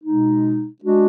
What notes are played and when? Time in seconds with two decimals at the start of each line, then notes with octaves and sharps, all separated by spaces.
0.03 B2 G#3 D#4
0.82 G#3 D4 F#4